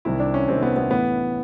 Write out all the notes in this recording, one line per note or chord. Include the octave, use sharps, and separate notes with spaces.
C2 C3 D#3 E4
D4
C#4
C2 C3 D#3 C4
B3
B3
A2 E3 B3